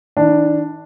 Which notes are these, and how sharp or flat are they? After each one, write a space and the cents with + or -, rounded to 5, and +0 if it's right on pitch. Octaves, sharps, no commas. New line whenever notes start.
D#3 +45 D4 +0